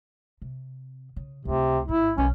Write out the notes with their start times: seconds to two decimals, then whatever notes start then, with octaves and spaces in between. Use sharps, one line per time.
0.42 C3
1.16 C#3
1.45 C#2 C3 A3
1.88 A1 G#2 E4
2.18 B1 C#4